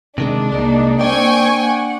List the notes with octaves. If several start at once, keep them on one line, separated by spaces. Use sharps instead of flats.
C3 D#3 G#3 D4
C2 G#3 A#3 D#4
A#3 C4 D4 D5 G5 G#5 C#6
F#5